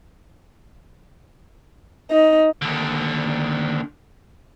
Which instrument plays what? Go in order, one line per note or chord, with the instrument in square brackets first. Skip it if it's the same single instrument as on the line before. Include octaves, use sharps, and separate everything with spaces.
[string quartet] D#4
[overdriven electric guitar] D#2 D3